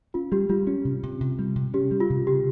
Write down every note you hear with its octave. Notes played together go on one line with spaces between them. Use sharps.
C#4 F4
G3 G4
G3 F4
C#4
C3
C3
C3
G3
C3
C#4 G4
G3
F4
C3
C#3 G4